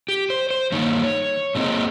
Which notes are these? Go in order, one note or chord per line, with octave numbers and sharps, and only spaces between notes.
G4
C5
C5
G2 D#3 A#3 D#4 C#5
A#2 G#3 C4 D#4